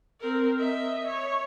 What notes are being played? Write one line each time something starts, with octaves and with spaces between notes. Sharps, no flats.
C4 A#4
D#5 E5
C#5